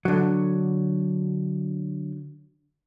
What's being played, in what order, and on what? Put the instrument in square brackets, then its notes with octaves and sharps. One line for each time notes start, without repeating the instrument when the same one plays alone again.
[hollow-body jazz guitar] D3 F#3